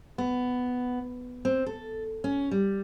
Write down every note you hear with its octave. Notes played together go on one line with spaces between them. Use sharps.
B3
C4
A4
C#4
G3